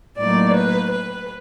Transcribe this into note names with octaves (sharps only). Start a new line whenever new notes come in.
A2 F#3 A#3 D#4 D5
B4
B4